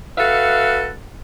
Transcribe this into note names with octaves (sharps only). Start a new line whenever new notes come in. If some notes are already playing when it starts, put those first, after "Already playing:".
F#4 A4 B4 E5 F5